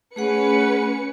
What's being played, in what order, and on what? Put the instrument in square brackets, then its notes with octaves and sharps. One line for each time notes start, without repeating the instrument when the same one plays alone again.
[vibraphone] A3 G#4 F#5 [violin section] C#4 B4 C#7